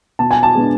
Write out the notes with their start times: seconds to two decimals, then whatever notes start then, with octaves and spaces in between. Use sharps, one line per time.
0.19 B2 A5
0.31 G#5
0.43 A5
0.55 G#3 B3 D4